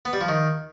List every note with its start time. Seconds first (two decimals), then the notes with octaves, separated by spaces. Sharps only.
0.05 B3
0.13 G3
0.21 F3
0.28 D#3